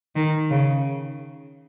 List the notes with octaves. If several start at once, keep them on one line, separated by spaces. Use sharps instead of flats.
D#3
C#3